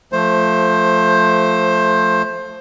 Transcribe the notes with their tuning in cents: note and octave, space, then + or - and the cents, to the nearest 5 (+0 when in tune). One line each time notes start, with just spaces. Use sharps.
F3 +0 A3 +0 C5 +15